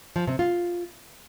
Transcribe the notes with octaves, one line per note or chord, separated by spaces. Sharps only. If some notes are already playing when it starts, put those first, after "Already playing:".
F3
C3
F4